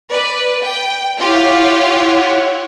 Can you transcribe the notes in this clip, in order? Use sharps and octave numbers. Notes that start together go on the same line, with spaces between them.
B4 D5
G5
E4 F4 G4 C#5 F5 F#5